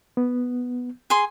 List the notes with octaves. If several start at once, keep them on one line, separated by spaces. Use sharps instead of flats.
B3
G#4 C6